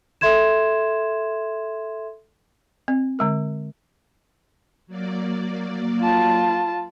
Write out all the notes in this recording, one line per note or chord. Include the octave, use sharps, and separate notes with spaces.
A4 E5 C6 G#6 E7
C4
D3 G#3 A#4
F#3 A#3 D5
F4 A5